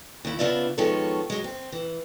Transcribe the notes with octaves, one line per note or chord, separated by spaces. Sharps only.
D#2 E4
C#3 B3 D4 F4 D5 E5
D#3 F3 G#3 B3 A4 C#5
F#3 G#3
C4
E3